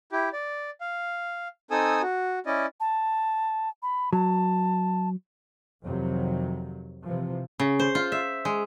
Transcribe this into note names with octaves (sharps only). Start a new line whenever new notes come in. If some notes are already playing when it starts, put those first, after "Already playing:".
E4 G4
D5
F5
C4 D#4 A4 G#5 D#6 E6
F#4
C#4 E4 D5 D#5
A5
B5
F#3 A5
F2 C3 D#3 F#3
C3 E3 F3
C#3
C5
F4
E5
G#3